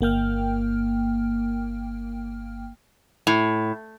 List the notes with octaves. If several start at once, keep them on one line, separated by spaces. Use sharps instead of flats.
G1 A#3 G5 F6
A2